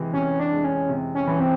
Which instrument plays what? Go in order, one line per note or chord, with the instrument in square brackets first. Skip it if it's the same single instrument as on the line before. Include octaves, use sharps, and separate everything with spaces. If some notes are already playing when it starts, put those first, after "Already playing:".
Already playing: [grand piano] C3 E3 G#3
[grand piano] C3 [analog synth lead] C#4
[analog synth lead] D4
[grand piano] G#3
[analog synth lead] C#4
[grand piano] C3
[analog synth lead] C#4
[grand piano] E3
[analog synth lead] C4